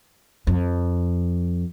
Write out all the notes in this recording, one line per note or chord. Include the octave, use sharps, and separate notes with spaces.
F2